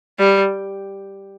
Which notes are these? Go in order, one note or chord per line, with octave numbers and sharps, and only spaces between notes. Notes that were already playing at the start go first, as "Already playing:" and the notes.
G3